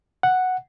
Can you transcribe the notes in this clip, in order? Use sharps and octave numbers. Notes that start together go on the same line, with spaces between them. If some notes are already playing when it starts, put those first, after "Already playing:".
F#5